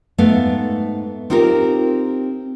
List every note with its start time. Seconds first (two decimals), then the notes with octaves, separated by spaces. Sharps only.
0.18 G#2 A3 B3 F5
1.30 C4 D#4 F4 G4 A#4